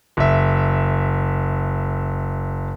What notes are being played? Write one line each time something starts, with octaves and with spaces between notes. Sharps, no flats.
F#1 E5